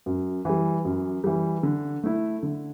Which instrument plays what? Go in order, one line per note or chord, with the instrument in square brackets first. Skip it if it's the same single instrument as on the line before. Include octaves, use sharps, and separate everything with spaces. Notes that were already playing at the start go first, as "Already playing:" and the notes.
[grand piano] F#2
E3 G3
F#2
E3 G3
D3
A3 E4
D3